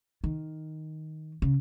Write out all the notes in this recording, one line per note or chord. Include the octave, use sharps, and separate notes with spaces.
D#3
C#3